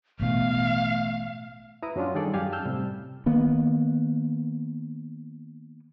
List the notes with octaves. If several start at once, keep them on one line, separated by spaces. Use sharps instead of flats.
A1 B2 E3 A3 F5
E4 B4 A#5 D#6
F#2 F#3 C#4 D4 F4
D#3 G3 D#4 G#4 A4 D5
F#2 G4 F5 G#5
A5 E6 F6 G6
A2 C3 G3
D#3 A#3 B3